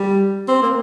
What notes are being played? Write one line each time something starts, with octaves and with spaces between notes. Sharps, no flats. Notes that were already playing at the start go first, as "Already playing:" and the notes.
Already playing: G3
C4
A#3